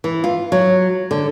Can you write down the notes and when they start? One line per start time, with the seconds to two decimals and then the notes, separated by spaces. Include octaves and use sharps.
0.04 E3
0.24 F4
0.52 F#3
1.11 D3